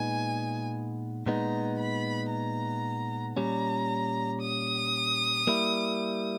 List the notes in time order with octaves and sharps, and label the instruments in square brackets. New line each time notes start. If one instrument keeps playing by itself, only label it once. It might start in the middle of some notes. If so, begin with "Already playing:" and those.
Already playing: [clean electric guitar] A#2 G#3 B3 D#4 [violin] G#5
[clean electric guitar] A#2 G#3 B3 D#4 [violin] A#5
[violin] B5
A#5
[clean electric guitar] A#2 G3 C#4 [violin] A#5
[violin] D#6
[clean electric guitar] G3 A#3 E4